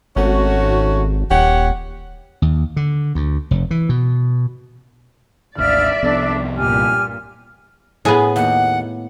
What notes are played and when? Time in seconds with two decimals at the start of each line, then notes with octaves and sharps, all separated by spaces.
0.16 G#1 A3 C#4 F#4
1.31 D#1 G4 C#5 F#5
2.42 D#2
2.77 D3
3.15 D2
3.51 F1
3.71 E3
3.89 B2
5.58 G#1 D2 D3 D5 E5 F5 E6 F6
6.03 C2 F3 B3 D4 A4
6.57 G2 A#2 G4 G#5 F6
8.05 A2 B3 G#4
8.36 D#2 F#5